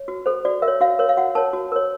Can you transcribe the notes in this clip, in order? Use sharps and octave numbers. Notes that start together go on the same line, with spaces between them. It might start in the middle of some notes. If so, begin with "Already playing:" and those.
Already playing: C#5
F#4
A4 C5
F#4 D5
A#4 E5
C#5
F#4 F5
A#4 C#5
F5
F#4 F#5
A#4 C#5 A5
F#4
A#4 C#5